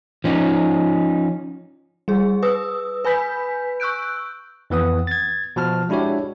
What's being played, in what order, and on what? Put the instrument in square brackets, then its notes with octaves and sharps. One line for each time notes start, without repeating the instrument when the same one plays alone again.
[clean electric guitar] F3 C#4 D#4
[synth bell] G3 G#4
B4 D#6 E6
B4 G#5 B5 G6 B6
C#6 E6 F#6 G6 D7
[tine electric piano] F2 E3 B3 D#6
G#6 A6
B2 F3 A5 F6
G#3 D4 E4 F#4 G4 C#5